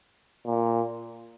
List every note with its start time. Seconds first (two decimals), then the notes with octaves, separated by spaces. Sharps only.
0.46 A#2